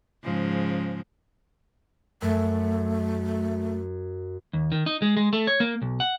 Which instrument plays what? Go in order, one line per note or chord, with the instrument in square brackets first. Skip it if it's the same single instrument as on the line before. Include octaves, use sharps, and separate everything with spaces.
[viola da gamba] G#2 C#3 F3
[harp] F#2 [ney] A3
[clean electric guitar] D#2
D#3
D#4
G#3
G#3
A3
C#5
A#3
B1
F#5